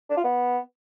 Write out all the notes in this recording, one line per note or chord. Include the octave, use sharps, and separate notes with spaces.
D4
F4
B3